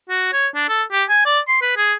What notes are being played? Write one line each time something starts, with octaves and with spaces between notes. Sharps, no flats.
F#4
C#5
D4
A4
G4
G#5
D5
C6
B4
G#4